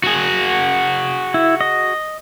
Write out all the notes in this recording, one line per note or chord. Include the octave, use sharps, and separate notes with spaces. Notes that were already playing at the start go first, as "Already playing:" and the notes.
F#4 G#4
E4
D#5